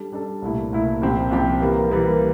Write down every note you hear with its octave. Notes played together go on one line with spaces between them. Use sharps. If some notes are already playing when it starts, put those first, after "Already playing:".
Already playing: G3 D4 A4
G3 D4 A4
C2 A#2 A3 E4
C2 A#2 A3 E4
C2 A#2 F3 C4 G4
C2 A#2 F3 C4 G4
E3 G3 A#3
E3 G3 A#3